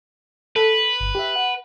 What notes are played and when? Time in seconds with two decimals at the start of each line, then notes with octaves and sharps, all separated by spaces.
0.56 A4 B4
1.00 G1
1.15 G4 E5
1.36 F#5